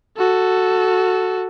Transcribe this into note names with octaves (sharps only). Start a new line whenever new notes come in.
F#4 A4